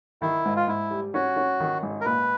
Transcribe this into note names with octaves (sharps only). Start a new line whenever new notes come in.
D#3 E4
G#2
F4
G#2 E4
G3
C#4 F#4
C#4
D#3
G#1
A#4
A#2 B4